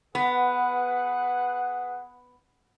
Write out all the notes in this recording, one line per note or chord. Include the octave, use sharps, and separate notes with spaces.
B3 G#4 B4 F#5